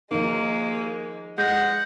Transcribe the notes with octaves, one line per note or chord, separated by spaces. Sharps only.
F3 G#3 A#3 D#4
G#3 F#5 G6 A#6